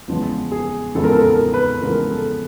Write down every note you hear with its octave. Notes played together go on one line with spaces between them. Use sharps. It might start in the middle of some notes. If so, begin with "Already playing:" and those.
E2 C#3 F3 G#3 B3
G#4
E2 C#3 F3 G#3 B3 A4
A#4
A4
A#4
B4
E2 C#3 F3 G#3 B3 A#4
A4